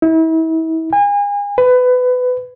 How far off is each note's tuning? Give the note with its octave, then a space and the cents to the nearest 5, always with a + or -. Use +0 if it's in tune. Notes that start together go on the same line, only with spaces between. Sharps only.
E4 -35
G#5 -35
B4 +20